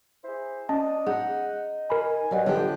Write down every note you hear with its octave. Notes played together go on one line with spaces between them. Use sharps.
E4 G#4 C5
C#4 D4 D5 D#5 A5
D#4 G#4 F#5
A#4 G#5 B5
G2 F#3 D5 D#5 F#5
D3 F3 G4